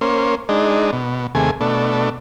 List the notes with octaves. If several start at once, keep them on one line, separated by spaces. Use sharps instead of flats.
A#3 C#4 C5
G#3 D4 D#4
B2
D#2 C3 A3 G#4 G#5
B2 A3 D4